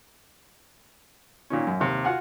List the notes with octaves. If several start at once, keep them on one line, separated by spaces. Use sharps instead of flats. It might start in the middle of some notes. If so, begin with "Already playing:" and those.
A#2 D#3 C#4
F#2
D#2 C3
F4 F#4 F5 F#5 G#5